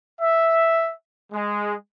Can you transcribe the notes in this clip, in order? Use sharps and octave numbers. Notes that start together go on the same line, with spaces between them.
E5
G#3